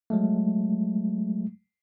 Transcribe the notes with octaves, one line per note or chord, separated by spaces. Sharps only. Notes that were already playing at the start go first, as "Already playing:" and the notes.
F#3 G#3 A3